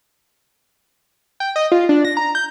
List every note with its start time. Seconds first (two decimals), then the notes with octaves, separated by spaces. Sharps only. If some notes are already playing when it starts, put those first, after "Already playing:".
1.40 G5
1.56 D#5
1.72 F4
1.89 D4
2.05 A#6
2.17 A#5
2.35 G6